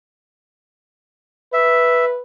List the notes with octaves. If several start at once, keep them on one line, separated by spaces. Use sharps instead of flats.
B4 E5